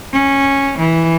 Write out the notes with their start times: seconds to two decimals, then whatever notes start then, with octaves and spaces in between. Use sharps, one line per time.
0.13 C#4
0.78 E3